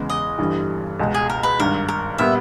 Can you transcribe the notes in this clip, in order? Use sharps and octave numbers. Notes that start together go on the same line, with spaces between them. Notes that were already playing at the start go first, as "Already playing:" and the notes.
Already playing: E2 C#3 G#3 B3
D#5
G1 G2 E3 G3
C#2 B2 G#3
G#4
A#4
B4
G#1 G2 D#3 A#4
A#4
A#2 G3 B3 E5